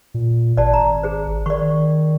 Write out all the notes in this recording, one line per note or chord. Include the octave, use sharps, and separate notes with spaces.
A#2
G#1 D5 A5
A#5
G#4 C5
D#3 D5 C#6